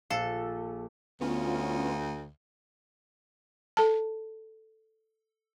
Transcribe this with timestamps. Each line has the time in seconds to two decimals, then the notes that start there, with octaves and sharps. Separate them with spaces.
0.10 A#1 A4 F5
1.21 D2 B3 C#4 F4
3.77 A4 A5